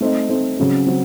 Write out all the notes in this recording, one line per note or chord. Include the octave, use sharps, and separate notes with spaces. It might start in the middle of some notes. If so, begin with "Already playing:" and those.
A3 C4 D#4
A3 C4 D#4
C#3 F#3 C4
C#3 F#3 C4